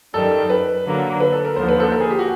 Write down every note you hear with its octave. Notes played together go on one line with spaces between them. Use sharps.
F#2 D#3 G3 A4
B4
D3 F#3 A#3
B4
A4
A#4
D#2 D3 F3 C5
B4
A4
A#4
G#4
G4
F#4